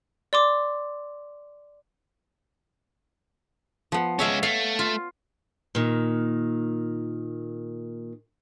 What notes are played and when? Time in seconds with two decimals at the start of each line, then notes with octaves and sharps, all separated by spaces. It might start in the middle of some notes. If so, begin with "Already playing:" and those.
0.33 D5 C6 D6
3.92 F3 B3
4.19 G#3 C#4 C#5 E5 F5
4.43 A3 F5
4.79 F4
5.75 A#2 D#3